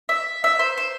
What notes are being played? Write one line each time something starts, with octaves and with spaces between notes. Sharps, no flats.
E5
E5
C5
C5